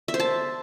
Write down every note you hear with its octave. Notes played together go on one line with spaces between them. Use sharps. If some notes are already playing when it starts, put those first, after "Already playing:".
E5
C5
A5